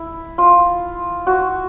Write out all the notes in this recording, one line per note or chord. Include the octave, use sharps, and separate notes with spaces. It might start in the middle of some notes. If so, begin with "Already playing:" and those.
Already playing: E4
F4
F#4